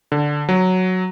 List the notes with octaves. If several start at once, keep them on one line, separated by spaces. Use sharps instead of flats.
D3
F#3